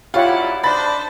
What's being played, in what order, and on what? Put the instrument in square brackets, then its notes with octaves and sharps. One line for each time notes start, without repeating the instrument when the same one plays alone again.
[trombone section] F#2 G3 E4 [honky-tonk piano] F4 [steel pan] G4 C#5 F#5
[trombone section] D4 D#4 [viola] C5 A5 [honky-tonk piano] B5 A6